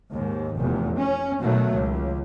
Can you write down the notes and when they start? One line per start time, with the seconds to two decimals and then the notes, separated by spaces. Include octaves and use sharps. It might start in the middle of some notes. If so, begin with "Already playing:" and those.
0.11 D#2 G#2
0.57 F1 E2
0.98 C#4
1.40 B2 D#3 F#3 A3
1.74 C#2